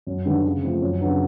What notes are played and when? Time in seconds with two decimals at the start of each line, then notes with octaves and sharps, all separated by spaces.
0.07 F#2
0.25 D3 G3 B3 D#4
0.44 C#3
0.63 F3 A3 C4
0.81 F#2
1.01 C#3 F#3 B3 D4